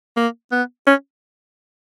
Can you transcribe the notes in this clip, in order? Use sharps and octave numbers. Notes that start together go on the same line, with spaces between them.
A#3
B3
C#4